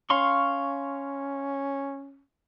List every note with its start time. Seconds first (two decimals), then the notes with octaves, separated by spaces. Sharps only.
0.10 C#4 F5 C6 C#6